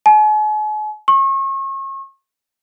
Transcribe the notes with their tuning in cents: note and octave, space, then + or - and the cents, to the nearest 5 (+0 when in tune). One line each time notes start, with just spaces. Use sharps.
G#5 +45
C#6 -35